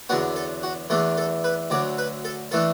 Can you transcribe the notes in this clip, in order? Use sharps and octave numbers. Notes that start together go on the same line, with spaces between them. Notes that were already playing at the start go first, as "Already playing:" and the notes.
E2 D3 F#3 B3 D4 F#4
A4
F#4
E2 E3 A3 D4 A4
A4
B4
D2 D3 F#3 D5
B4
A4
E3 A3 D4 A4